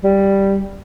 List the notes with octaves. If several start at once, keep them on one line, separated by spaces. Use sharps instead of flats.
G3